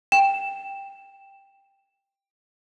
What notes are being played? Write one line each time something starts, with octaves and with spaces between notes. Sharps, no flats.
G5 E7